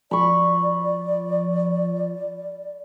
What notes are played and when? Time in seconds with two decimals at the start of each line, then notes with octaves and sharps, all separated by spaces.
0.11 F3 D5 B5 C#6